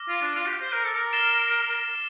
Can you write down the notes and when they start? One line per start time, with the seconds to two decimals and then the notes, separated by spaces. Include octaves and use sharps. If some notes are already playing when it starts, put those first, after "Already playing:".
Already playing: D6 F6 A#6
0.09 F4
0.22 D4
0.36 F4
0.48 G4
0.62 C5
0.73 A#4
0.85 A4
0.97 A#4
1.13 F6 A6 C7 E7 G7